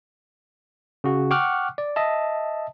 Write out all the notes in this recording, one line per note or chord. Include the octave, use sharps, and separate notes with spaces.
C#3 F#4
F#5 G5 C#6 D6 F6 F#6
D5
D#5 E5 A5